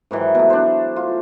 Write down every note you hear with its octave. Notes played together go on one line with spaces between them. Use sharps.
G#2 D#3 E3 F#3
B2 A3
D4 C5
F4